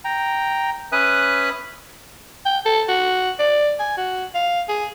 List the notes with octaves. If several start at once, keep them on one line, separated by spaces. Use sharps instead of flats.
G5 A#5
C#4 B4 E5 G#5 D#6 F#6
G5
A4
F#4
D5
G#5
F#4
F5
G#4